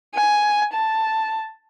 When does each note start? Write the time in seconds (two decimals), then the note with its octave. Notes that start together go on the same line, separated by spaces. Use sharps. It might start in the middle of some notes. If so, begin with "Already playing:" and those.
0.15 G#5
0.74 A5